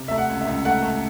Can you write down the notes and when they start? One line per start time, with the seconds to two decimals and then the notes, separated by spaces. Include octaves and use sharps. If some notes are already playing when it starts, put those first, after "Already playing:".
Already playing: C3
0.08 A3 E5
0.18 F#5
0.30 C#2
0.41 E5
0.47 C#2
0.65 A3 F#5
0.83 A3